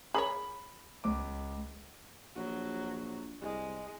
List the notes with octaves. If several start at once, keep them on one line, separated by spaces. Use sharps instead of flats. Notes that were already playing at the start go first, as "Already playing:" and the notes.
G#4 A#4 C#5 B5 F#7
C#2 D6
A#1 F#3
C2 G#3